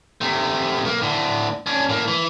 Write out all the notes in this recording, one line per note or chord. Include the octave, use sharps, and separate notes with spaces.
C3 A3
B1 A#3
A2 D3
C#4 D4
A2 A#3
E3